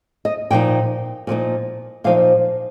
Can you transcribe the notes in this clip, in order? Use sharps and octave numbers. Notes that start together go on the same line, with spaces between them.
D#5
A#2 F3 D#4 G5
A#2 F3 A#3 D#4
A#2 F3 A#3 D#4 F5